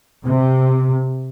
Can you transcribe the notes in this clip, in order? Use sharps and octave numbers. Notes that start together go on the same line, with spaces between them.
C3